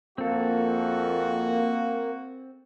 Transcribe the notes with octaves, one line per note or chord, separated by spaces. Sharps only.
F2 A#3 C4 F#4 A4